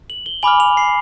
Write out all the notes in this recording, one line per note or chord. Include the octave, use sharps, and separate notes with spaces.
F#7
G7
G#5 B5 D6 F6 F#7
F7
C7